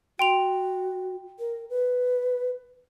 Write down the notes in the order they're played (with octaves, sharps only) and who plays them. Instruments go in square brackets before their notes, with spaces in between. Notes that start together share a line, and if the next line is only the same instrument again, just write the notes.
[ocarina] F#4 [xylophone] G5 C6 F7
[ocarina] A#4
B4